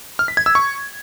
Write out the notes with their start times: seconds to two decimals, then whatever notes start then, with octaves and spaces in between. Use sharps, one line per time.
0.19 F6
0.28 B6
0.37 G#6
0.46 E6
0.55 C#6